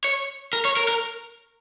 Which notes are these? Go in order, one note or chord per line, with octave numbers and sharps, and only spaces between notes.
C#5
A#4
C#5
A#4
A#4